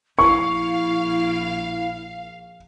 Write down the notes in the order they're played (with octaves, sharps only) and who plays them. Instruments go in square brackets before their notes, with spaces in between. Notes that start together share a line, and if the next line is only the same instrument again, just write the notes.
[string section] A#1 F5 [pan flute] E4 [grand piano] C#6